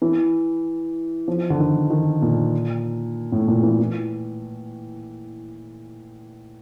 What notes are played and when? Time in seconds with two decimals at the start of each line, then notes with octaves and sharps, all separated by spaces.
0.02 E3
1.28 F3
1.50 D3
1.59 D#3
1.90 D#3
2.22 A#2
3.32 A2
3.48 A#2
3.63 E3
3.79 E3